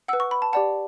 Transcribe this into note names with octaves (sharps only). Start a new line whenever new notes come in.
B4 F#5 E6
C#6
B5
A5
G4 D5 F#5 A5